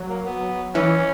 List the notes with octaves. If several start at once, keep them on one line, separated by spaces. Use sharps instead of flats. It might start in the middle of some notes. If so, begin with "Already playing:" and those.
Already playing: F#3
A#3
B3
E3 C#4